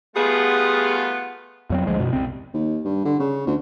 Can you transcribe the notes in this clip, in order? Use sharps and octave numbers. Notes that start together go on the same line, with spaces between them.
G3 A3 B3 F4 G#4
F2 F#3 C4
D2 F3 G#3
F#2 B2
C2 C4
D#2
G2
D3
C#3
D2